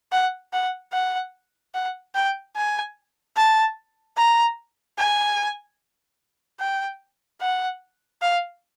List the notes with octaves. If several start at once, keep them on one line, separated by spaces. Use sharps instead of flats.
F#5
F#5
F#5
F#5
G5
G#5
A5
A#5
G#5
G5
F#5
F5